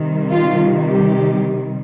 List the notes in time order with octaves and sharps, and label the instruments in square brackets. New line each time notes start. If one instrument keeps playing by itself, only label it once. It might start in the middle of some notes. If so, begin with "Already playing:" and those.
Already playing: [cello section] C3 D#3 G3
F4
G4